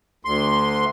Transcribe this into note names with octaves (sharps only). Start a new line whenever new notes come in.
D2 C6